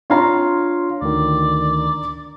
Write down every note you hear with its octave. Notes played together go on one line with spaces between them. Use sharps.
D4 F4 C#5 F5 A#5 C6
D2 D#3 D5